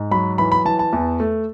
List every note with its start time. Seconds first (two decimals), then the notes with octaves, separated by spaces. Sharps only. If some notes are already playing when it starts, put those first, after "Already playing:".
Already playing: G#2
0.11 F#3 B5
0.38 E3 B5
0.52 B5
0.65 E3 A5
0.79 A5
0.93 E2
1.20 A3